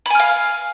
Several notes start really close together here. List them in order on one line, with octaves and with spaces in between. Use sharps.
B5 G#5 F6 F5